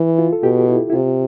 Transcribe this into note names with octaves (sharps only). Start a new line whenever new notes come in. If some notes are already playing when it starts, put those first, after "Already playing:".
Already playing: E3
F4
A4
B2 G4
E4
E4
C3 F4